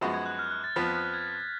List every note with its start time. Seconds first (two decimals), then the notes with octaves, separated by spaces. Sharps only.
0.01 F#2 F3 G#3 B3 F#4
0.14 G#6
0.26 F#6
0.39 F6
0.51 F#6
0.64 A6
0.76 F2 F3 B3 B6
1.14 G#6